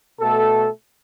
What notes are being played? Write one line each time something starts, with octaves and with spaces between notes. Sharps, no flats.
B2 A3 A4